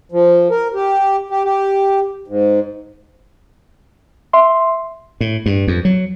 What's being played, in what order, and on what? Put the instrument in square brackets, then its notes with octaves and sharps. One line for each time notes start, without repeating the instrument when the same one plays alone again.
[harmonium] F3
A#4
G4
G4
G4
G#2
[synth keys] E5 C6
[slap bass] A2
G2
F2
F#3